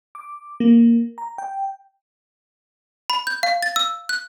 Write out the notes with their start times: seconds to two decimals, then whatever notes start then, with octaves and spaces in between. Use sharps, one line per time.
0.15 D6
0.60 A#3
1.18 A#5
1.38 G5
3.10 B5
3.27 G6
3.43 F5
3.63 A6
3.76 E6
4.09 F#6